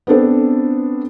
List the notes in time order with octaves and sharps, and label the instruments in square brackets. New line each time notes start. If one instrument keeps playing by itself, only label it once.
[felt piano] B3 C4 D4 A4 C5